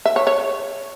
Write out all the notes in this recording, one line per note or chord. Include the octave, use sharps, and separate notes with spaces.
E5
C#5
C#5